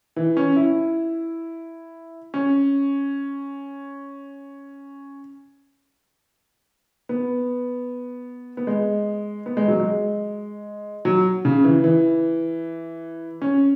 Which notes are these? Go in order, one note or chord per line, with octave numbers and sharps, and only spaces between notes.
E3
C#4
E4
C#4
B3
B3
G#3
B3
G#3
F#3
G#3
F#3
C#3
E3
E3
C#4